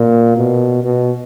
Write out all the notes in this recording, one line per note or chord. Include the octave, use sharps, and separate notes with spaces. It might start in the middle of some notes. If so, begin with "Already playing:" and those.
Already playing: A#2
B2
B2